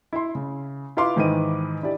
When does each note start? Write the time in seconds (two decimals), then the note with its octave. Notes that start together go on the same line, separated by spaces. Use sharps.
0.13 E4 C6
0.35 C#3
0.97 E4 F4 B4 F5 C6 D6
1.16 G#2 D#3 E3 B4 D#5 D#7
1.82 D4 E4 G4 D5